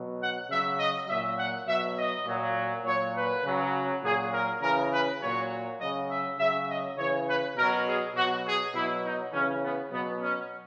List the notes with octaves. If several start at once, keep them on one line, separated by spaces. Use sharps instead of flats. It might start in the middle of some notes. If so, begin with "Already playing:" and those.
Already playing: B2 F#3
F#5
C#3 F#3 E5
D#5
A#2 F#3 E5
F#5
B2 F#3 E5
D#5
A#2 F#3
A#2 F#3 C#5
B4
C#3 F#3
A#2 F#3 G#4
A#4
C#3 E3 A#4
B4
A#2 F#3 C#5
C#3 F#3 D#5
E5
C#3 F#3 E5
D#5
C#3 E3 C#5
B4
B2 F#3 A#4
G#4
B2 F#3 F#4
G#4
B2 F#3 E4
D#4
C#3 E3 C#4
B3
B2 F#3 B3
C#4